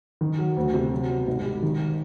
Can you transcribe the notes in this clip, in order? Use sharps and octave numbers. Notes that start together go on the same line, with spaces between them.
D#3
F#3
D2
C3
F#3
B2
G#1
G3
D#3